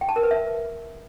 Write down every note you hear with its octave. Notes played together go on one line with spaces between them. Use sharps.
G5
A5
A#4
B4
E5